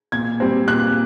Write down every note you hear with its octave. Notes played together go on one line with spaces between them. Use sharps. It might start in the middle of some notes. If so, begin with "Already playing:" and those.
A#2 G#6
G3 C4
A#2 F#6